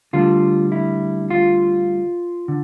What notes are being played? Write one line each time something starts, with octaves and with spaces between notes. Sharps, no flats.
D2 D3 G3 F4
E4
F4
D3